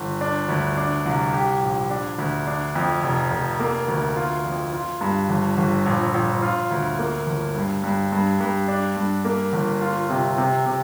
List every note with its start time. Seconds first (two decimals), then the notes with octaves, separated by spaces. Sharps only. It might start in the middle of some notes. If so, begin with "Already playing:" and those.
Already playing: G1
0.21 D4
0.49 D2
0.77 D4
1.05 C2
1.34 G4
1.62 A#1
1.90 D4
2.18 D2
2.47 D4
2.75 F2
3.03 F1
3.31 F1
3.60 A#3
3.88 D2
4.16 F4
4.44 F2
4.73 F4
5.01 G2
5.29 G1
5.57 G1
5.86 A#1
6.14 A#1
6.42 F4
6.71 D2
6.99 A#3
7.27 G1
7.55 G2
7.84 G2
8.12 G2
8.40 G2
8.68 D4
8.96 G2
9.25 A#3
9.53 G1
9.81 F4
10.10 C3
10.38 C3
10.66 C3